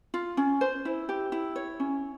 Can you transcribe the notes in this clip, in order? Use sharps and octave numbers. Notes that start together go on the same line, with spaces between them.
F4
C#4
C5
E4
G4
E4
C#5
C#4